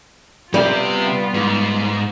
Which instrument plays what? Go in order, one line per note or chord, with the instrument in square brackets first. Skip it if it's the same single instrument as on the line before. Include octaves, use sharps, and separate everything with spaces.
[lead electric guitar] C3 G4 [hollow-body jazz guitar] G3 [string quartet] B3 F4
[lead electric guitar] G#2